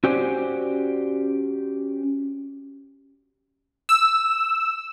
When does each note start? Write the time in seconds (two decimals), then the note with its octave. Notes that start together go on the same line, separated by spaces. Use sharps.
0.04 C#4 F#4 G4 C5 D5 G#5
3.89 E6